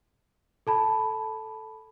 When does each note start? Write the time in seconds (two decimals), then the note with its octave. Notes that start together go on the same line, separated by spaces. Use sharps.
0.67 A4 A5 B5